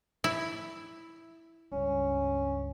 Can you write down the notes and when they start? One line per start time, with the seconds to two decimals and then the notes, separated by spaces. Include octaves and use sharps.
0.24 E4
1.72 C#2 G2 C#4